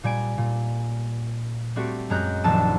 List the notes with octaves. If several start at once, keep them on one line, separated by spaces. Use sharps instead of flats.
A#2 G3 G#5 D7
A#2
G3 A3 C4 F#4 G4
F#2 G#3 A#5 F#6 G6
D#1 A#1 F#3 A5 E6 D#7